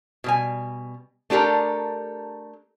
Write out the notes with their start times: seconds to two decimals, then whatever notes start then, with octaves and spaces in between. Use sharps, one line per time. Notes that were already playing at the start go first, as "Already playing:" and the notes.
0.24 B2 G3 G#5
1.30 A3 D4 G4 A4 A#4